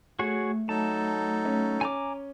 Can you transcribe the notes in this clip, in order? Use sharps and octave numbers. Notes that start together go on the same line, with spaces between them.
A3 F#4 G#4 C#5
F#3 D#4 A4 A5
C#4
G#5 A#5 D6